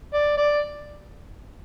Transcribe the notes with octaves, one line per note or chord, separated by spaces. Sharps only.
D5
D5